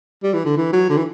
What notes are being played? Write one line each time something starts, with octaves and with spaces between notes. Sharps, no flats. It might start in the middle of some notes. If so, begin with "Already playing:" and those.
G3
E3
D3
E3
F#3
D3
E3